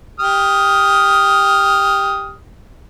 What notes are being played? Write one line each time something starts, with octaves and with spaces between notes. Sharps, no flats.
G4 D#6 F6